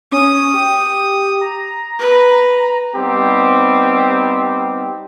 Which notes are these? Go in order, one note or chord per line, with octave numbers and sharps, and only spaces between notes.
C#4 D#6
G4
A#5
B4
G3 B3 C4 D#4 G4